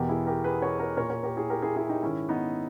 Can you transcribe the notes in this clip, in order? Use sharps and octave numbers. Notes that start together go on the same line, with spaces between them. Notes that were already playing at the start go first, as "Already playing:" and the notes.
Already playing: E2 B2 G4 A#4
E4 G#4
G4 A#4
G#4 B4
A#4 C#5
A#4 C#5
A#2 A#4 C#5
A#4 C#5
G4 A#4
E4 G#4
G4 A#4
E4 G#4
E4 G#4
D#4 G4
G#2 D#3 C#4 E4
B3 D#4